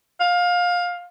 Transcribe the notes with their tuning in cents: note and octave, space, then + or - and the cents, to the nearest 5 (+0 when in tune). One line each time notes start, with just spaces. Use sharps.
F5 +20